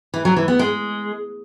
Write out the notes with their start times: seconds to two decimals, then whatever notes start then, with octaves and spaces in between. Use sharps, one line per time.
0.14 E3
0.25 F#3
0.36 E3
0.48 B3
0.59 G#3